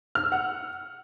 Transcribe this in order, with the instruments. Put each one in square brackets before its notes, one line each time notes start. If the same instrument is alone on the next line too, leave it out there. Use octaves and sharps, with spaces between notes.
[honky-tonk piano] F6
E6
F#5